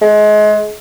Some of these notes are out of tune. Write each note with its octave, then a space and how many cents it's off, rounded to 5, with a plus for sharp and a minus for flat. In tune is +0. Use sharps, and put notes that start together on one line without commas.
G#3 +30